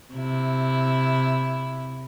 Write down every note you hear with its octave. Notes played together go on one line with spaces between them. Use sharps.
C3 E4